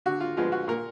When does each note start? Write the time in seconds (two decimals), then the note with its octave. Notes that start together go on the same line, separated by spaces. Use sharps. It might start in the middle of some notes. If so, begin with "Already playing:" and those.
0.06 D3 F#4
0.20 F4
0.37 F3 G#3 B3 F4
0.52 F#4
0.68 A#2 A#4